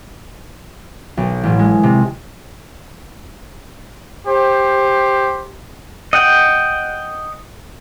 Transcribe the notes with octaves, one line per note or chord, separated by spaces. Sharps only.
B1
A1
G#3
C3
G4 C5
D#5 F#5 G5